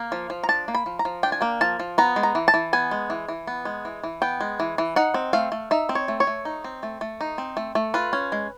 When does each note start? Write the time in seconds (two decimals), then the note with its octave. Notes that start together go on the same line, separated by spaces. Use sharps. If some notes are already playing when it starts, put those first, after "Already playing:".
Already playing: A#3
0.12 F3
0.30 F3
0.43 A#5
0.49 D4 A5
0.68 A#3
0.74 B5
0.86 F3
0.99 A#5
1.05 F3
1.23 D4 G5
1.32 G#5
1.41 A#3 G5
1.61 F3 A5
1.80 F3
1.98 B3 A#5
2.16 G#3
2.23 A#5
2.35 E3
2.48 A5
2.54 E3
2.73 B3 G#5
2.91 G#3
3.10 E3
3.28 E3
3.47 B3
3.65 G#3
3.85 E3
4.03 E3
4.22 B3 G5
4.40 G#3
4.60 E3
4.78 E3
4.96 D#4 F#5
5.14 C4
5.33 A3 F5
5.52 A3
5.71 D#4 E5
5.89 C4
5.95 C#5
6.08 A3
6.20 C#5
6.27 A3
6.45 D#4
6.64 C4
6.83 A3
7.01 A3
7.21 D#4
7.38 C4
7.57 A3
7.75 A3
7.94 F4 B4
8.13 C#4
8.32 G#3